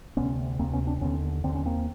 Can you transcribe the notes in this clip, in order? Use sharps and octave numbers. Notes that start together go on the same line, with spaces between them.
D2 C3 B3 C#4
D2 C3 A#3 C4
B3 C#4
C4 D4
D#2 D3 B3 C#4
D#2 D3 C4
C#4
A#3 C4